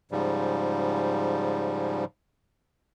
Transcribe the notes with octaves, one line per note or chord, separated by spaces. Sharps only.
G#2 C#3 F3 G3